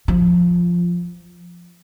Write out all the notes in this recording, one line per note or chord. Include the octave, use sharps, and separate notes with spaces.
F3